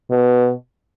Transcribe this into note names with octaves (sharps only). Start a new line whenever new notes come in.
B2